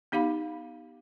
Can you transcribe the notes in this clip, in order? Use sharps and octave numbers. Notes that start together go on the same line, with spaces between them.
B3 D#4 G4 F5 B5